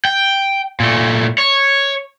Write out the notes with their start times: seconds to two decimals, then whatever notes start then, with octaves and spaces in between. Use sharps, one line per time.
0.05 G5
0.80 A#2 A3
1.38 C#5